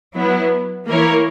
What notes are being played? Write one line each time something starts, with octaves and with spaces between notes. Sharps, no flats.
F#3 B3 E4
E3 A#3 E4 A#4 C#5